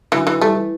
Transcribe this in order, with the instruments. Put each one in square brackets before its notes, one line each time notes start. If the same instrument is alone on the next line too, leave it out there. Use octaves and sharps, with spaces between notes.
[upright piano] D3 F#3 [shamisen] E3
[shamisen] E3
[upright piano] E3 G3 [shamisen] A3
[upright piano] E3